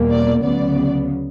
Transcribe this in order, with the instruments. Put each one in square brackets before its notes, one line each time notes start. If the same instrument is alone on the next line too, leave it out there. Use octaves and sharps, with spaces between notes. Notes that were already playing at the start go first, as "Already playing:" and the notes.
Already playing: [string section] E2 B2 G3 A#3
D5
D2 C#3 F#3 B3 D5